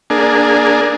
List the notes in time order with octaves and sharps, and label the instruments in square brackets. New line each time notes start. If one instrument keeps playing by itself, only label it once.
[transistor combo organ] A#3 D4 G#4